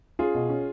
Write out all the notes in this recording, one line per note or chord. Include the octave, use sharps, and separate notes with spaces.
C#4 F4 G#4
B2
C#4